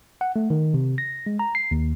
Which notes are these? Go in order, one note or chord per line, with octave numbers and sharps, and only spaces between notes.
F#5
A3
D#3
C3
A#6
G#3
A#5
C7
D#2